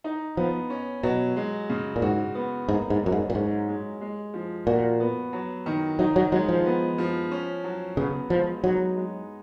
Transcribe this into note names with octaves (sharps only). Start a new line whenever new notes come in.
D#4
F3 B3
C#4
B2 F#3
G#3
C#3
A#2
G#2 F#4
B3
G#2 A#3
G#2
F#2 F#3
G#2
A#2
G#2 C#4
G#3
G#3
F3
A#2 F#4
B3
F#3
D#3
F#3 D#4
F#3
F#3 G#3
F3
B3
F3
C#4
F#3
C#3 B3
F3 G#3
F#3 D#4
G#3